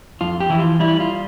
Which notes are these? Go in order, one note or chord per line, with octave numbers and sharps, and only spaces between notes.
F2 F4
G4
E3 E4
F4
G3 E4
F4